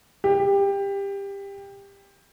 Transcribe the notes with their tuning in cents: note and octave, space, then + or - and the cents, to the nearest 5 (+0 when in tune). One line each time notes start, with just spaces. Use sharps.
G4 +20